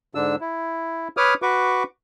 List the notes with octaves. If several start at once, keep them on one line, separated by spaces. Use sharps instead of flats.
G#2 D3 D4 E6
E4
B4 C#5 D6 D#6 F6
F#4 B4 C#6 D6